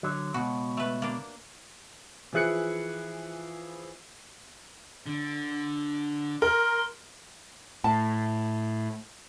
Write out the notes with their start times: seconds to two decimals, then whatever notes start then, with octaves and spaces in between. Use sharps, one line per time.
0.03 D3 F#3
0.34 C#2 G2 B2 F#4
0.77 A3 B4
1.02 A#3 D4
2.33 E3 F3 E4 G#4 F#6 C#7
5.06 D3
6.42 A#4 C6
7.84 A2 A5